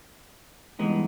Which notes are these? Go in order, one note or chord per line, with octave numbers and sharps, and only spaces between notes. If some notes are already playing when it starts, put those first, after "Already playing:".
G2 E3 G#3 B3 D#4